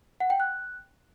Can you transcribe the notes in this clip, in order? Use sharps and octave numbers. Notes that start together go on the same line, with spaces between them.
F#5
G5
F#6